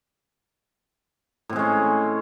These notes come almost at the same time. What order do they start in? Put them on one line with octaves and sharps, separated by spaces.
A2 C4 G#3 C#4